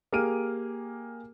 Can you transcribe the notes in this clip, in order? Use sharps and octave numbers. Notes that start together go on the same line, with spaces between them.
A#3 G4 G#4 F6 D7 D#7